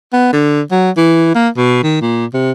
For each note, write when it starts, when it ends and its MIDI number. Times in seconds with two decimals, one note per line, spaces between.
0.13 0.33 59
0.33 0.61 50
0.71 0.91 54
0.97 1.33 52
1.35 1.48 58
1.57 1.81 47
1.83 2.00 51
2.01 2.26 46
2.34 2.51 48